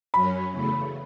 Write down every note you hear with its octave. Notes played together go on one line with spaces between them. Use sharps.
F#2 F#3 C#4 B5
E2 C#3 A3